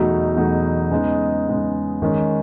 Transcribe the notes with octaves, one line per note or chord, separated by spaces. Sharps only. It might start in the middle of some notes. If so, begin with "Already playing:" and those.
Already playing: E2 B2 F#3 A3 D#4
E2 B2 F#3 A3 D#4
C#3 G#3 B3 D#4
C#3 G#3 B3 D#4
D#3 G#3 C#4